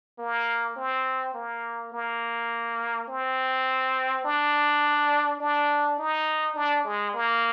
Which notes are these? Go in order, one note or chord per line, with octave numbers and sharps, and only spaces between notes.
A#3
C4
A#3
A#3
C4
D4
D4
D#4
D4
G#3
A#3